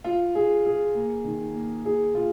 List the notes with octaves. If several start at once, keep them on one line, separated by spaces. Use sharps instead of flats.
F4
G#4
G#4
A#3
D#3
A#3
G#4
F4